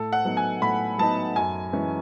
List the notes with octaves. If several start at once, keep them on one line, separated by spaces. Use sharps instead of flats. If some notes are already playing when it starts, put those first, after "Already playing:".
Already playing: A2 A4
F#5
F#3 B3 D#4
G#5
A2 B5
F#3 B3 D#4 A5
F#2 G#5
E3 G#3 C#4